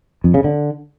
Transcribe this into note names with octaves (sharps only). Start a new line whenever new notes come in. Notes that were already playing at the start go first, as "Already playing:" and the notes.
F2
C#3
D3